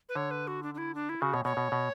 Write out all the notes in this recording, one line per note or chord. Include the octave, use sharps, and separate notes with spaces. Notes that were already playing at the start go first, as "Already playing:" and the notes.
B4
D3 C#5
B4
F#4
D4
D4
E4
D4
E4
C#3 F#4
B2 C#5
B2 C#5
B2
B2